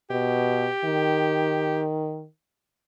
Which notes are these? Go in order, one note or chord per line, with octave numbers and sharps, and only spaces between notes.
B2 G4
D#3